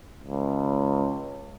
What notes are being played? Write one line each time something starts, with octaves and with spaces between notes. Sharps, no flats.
C#2